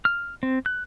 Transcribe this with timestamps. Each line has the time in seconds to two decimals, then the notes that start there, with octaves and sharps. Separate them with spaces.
0.05 F6
0.43 C4
0.66 F#6